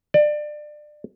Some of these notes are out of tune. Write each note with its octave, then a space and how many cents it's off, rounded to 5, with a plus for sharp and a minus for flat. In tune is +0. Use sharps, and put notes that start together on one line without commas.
D5 +25